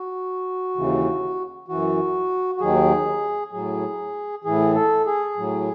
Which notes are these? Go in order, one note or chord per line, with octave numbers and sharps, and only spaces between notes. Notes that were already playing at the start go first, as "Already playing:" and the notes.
Already playing: F#4
D#2 C#3 E3
F#2 E3 F#4
F#4
D#2 D#3 F#3 G#4
A2 F#3 G#4
A2 E3 G#4
A4
G#4
A2 F#3